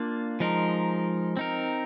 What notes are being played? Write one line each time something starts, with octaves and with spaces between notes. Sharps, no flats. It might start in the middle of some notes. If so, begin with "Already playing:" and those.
Already playing: A#3 D4 F4
F3 G#3 D#4 A#4
C4 D#4 A#4